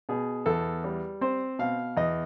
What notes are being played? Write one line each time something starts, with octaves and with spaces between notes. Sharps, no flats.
B2 G#4
E2 A4
G3
C4 C5
B2 F5
E2 D#5